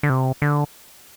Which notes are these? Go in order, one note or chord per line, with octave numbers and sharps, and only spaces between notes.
D3
C3
D3